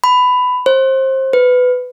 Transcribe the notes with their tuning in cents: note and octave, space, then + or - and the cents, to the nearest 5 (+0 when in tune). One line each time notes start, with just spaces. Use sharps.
B5 +15
C5 +25
B4 +15